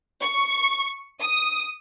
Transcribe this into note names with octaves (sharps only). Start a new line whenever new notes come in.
C#6
D#6